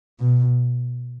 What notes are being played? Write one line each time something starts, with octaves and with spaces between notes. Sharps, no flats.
B2